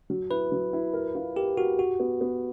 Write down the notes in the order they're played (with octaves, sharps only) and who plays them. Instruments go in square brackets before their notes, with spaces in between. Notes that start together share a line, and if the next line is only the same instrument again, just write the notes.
[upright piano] F#3
[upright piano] E4 [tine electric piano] B4
[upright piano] F#3
E4
A#4
F4
[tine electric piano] G4 [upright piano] A#4
[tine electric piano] F#4 [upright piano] A#4
[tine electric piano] F#4 [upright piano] G4
[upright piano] B3
B3